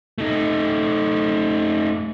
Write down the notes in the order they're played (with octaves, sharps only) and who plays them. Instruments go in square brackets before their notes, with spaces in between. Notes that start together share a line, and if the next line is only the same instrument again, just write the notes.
[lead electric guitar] A3 D#4